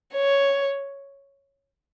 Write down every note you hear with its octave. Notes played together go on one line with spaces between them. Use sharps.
C#5